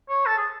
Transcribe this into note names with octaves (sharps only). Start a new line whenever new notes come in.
C#5
A4
G#4